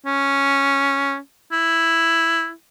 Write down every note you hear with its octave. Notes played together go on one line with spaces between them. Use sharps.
C#4
E4